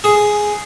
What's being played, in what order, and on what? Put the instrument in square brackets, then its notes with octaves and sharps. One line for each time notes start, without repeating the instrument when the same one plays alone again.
[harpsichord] G#4